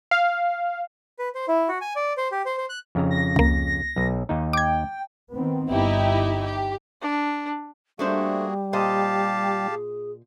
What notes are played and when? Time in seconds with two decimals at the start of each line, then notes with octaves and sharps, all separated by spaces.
0.11 F5
1.19 B4
1.35 C5
1.48 E4
1.68 F#4
1.81 G#5
1.96 D5
2.17 C5
2.32 G4
2.46 C5
2.58 C5
2.69 F#6
2.95 F2 C#3 A#5
3.10 A#6
3.36 C#2 A#3
3.96 B1
4.29 D#2 D#4
4.53 G5 D6 G#6
5.33 D#3 B3 C4
5.71 G1 D#4 E4 G4
6.42 G4
7.02 D4
7.99 G3 A3 A#3 D4 F#4 G#4 C5
8.73 A#2 G4 C5 D#5 F5 A5
9.70 G#4